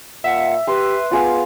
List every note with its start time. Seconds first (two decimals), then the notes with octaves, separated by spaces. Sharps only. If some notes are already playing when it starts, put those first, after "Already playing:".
0.24 A#2 E5 F#5
0.68 G4 B4 C6
1.12 B3 F4 G#4 F5